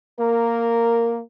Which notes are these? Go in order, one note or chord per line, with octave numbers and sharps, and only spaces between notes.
A#3 A#4